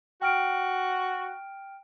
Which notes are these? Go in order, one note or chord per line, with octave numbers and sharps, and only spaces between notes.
F#4 G5 F6 D7